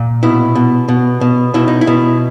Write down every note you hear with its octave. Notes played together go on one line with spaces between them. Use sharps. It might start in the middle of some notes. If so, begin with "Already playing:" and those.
Already playing: A#2
B2 E4
B2
B2
B2
B2 E4
D#4
E4
B2